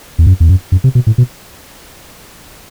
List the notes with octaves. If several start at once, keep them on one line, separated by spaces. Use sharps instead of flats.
E2
F#2
E2
F#2
F#2
C3
B2
A2
B2